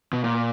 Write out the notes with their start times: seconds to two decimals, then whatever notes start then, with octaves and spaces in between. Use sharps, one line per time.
0.13 B2
0.24 A#2